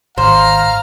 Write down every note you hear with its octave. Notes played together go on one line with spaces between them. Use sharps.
G#1 C5 F5 A#5 F6